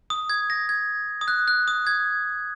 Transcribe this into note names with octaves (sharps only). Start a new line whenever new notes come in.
D#6
G#6
A#6
G#6
D#6
F#6
F#6
D#6
G#6